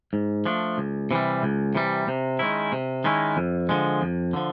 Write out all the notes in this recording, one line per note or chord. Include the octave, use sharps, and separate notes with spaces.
G#2
F3 A3 D4
C#2
C3 E3 G3
C#2
C3 E3 G3
C3
D#3 G#3 C#4 E4
C3
D#3 G#3 C#4 E4
F2
D3 F3 G#3
F2
D3 F3